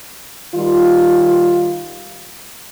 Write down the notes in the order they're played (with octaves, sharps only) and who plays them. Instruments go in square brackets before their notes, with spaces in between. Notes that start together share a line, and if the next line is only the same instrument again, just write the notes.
[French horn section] D#3 G3 F4